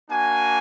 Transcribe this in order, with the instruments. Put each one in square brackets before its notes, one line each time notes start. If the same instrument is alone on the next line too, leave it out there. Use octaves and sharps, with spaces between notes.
[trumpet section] A#3 D4 F#4 G#5